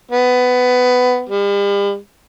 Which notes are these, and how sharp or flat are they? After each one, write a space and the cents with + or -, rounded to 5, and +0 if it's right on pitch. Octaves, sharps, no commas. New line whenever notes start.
B3 +15
G3 +40